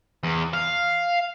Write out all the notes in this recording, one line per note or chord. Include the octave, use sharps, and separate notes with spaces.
E2
F5